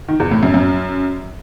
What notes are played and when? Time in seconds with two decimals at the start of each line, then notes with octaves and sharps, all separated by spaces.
0.08 D#3
0.20 E2
0.31 A2
0.43 F#2
0.54 F#2